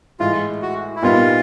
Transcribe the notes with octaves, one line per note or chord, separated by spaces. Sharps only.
A2 E3 G#3 F4
F#4
E4
A#2 G3 B3 D#4 F4